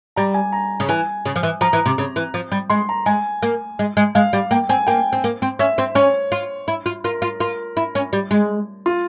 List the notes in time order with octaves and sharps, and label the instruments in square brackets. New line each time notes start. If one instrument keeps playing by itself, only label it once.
[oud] G3 [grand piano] A#5
[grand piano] G#5
A#5
[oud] C#3
[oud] E3 [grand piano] G#5
[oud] C#3
F3
E3
[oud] F3 [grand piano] A#5
[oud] E3
C3
C#3
E3
F3
G3
[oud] G#3 [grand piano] C6
[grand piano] A#5
[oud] G#3 [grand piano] G#5
[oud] A#3
G#3
G#3
[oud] G#3 [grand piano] F5
[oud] G3
[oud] A#3 [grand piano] G5
[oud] C4 [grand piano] G#5
[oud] A#3 [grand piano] G5
[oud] C4
A#3
C4
[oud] C#4 [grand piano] E5
[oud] C4
[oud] C#4 [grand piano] C#5
[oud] F4
E4
F4
[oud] F4 [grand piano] A#4
[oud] F4
[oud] F4 [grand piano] A#4
[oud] E4
C#4
G3
G#3
[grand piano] F4